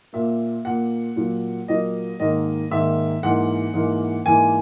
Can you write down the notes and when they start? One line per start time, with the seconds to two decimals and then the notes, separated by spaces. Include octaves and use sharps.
0.13 A#2 A#3 E5
0.65 A#2 A#3 F#5
1.16 A#2 F#3 A#3
1.68 A#2 F#3 A#3 D#5
2.20 G#2 D#3 A#3 D#5
2.71 G#2 D#3 A#3 E5
3.23 G#2 E3 A#3 F#5
3.74 G#2 E3 A#3
4.26 G#2 E3 A#3 G#5